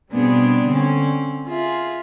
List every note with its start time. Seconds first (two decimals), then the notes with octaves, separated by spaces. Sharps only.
0.13 B2 G3 B3 C4 D4 G#4
0.66 D3 C4 C#4
1.48 F4 G#4 E5